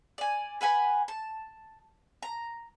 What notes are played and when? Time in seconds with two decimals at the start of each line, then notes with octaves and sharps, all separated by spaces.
0.18 D5 G#5
0.61 B4 F#5 G#5 B5
1.08 A5
2.23 A#5